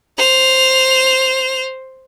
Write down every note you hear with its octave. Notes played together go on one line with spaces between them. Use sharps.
C5 F7